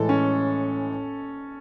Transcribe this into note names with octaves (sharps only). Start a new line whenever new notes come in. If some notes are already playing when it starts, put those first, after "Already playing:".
Already playing: A2 E3 G#3 A4
C#4